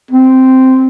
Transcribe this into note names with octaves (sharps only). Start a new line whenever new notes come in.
C4